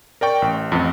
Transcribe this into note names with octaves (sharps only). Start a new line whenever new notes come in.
A#4 D5 G5 C#6
A1
A1 F2